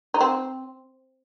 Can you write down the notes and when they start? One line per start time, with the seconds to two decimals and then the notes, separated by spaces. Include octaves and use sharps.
0.14 D#4
0.21 C4